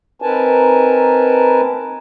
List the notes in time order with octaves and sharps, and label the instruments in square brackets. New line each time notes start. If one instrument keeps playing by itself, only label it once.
[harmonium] C4 D#4 A#4 B4 G#5 A5